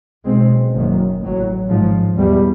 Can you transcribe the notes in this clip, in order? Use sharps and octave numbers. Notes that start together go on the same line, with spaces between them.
B1 B2 G#3 C4
F#1 F#2 D#3
A1 A2 F#3
G#1 G#2 F3
E2 B2 G3